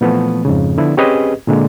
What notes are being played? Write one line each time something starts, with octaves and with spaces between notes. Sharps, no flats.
A#2 E3 F3 A3 B3
F2 G#2 C#3
D3 F3 B3 E4
C4 C#4 G4 G#4 B4 D#5
A#2 D3 G#3 A#3